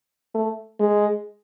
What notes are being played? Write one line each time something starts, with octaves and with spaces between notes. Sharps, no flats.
A3
G#3